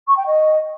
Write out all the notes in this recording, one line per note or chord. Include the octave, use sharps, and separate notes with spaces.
C#6
G5
D#5